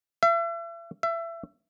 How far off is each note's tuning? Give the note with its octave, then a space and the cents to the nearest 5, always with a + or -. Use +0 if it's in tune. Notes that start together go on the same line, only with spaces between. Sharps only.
E5 +40
E5 +25